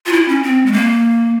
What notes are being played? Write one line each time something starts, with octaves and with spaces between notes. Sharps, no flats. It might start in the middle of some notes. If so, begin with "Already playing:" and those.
F4
E4
C#4
C4
G#3
A#3